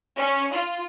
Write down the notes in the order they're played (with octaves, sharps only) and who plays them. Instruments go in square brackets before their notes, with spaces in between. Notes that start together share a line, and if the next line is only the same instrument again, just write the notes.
[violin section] C#4
F4